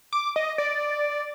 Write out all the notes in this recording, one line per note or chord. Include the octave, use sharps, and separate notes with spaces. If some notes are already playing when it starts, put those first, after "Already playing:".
D6
D#5
D5